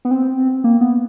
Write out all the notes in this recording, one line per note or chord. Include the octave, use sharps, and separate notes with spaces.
B3
C4
A#3
B3